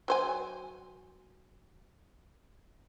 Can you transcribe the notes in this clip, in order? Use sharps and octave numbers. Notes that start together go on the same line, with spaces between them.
F#3 C5 G#5